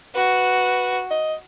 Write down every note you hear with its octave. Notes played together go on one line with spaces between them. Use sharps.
F#4 B4
D#5